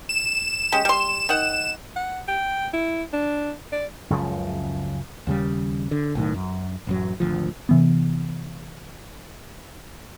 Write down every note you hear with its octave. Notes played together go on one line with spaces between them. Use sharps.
E7
G#3 C#4 G4
G3 C6
D#3 F#5
F#5
G5
E4
D4
D5
C#2 F#2 C#3 F3
D#2 C#3 G3
D3
B1 A2 D#3
F#2
A1 F#2 F#3
G#1 D2 F3
C3 E3 B3